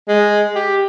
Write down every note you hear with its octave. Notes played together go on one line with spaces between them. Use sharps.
G#3
G4